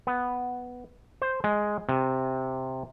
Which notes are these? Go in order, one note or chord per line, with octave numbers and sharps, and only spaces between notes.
B3
C5
G#3
C3